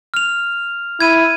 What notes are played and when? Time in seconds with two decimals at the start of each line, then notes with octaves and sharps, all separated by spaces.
0.14 F6 F7
1.00 E4 G#6 D#7